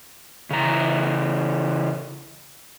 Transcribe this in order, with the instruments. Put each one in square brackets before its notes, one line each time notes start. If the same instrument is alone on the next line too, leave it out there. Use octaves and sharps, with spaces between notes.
[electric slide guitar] C#3 E3 A#5